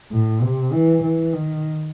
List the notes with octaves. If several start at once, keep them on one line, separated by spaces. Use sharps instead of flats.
A2
C3
E3
E3
D#3